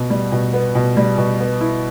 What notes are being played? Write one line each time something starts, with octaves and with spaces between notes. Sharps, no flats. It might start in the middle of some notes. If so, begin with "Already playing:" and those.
Already playing: B2 B3
G3
B2
B3
B2
G3
B2
B3
E4